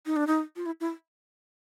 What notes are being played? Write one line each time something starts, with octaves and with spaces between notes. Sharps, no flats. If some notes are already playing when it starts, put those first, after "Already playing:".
D#4
D4
D#4
F4
E4
E4